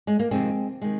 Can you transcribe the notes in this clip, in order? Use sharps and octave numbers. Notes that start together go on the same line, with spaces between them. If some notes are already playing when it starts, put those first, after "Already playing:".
G#3
A#3
F2 C3 D#3 G#3 C4
C3 D#3 G#3